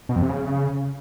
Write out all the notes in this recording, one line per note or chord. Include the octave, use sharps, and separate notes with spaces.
B2
F2
C3
C#3